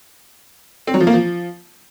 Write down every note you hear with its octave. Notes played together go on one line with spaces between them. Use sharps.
C4
F#3
F3
A#3
F3